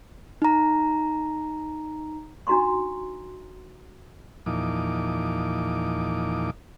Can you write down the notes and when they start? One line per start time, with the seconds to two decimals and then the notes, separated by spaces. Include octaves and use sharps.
0.42 D#4 A#5
2.47 D4 D#4 F#4 A#5 C6 C#6
4.46 E2 A#2 F3 D#4 D6